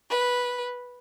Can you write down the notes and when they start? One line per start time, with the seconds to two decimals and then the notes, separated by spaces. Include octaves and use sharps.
0.10 B4